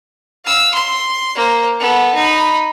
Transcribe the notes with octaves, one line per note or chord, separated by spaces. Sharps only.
F5 E6
C6
A#3 C5
B3 A4
D#4 B5